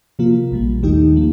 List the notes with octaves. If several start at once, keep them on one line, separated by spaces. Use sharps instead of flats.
C3 F3 A#3 F4
A#1 A#2 G3
D#2 D#3 A3 D#4 G4
F3 A#3